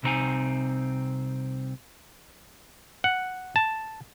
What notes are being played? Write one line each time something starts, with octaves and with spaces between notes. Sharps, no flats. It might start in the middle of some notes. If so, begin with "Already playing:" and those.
C2 C3 E3 C4 D#4 G#5
F#5
A5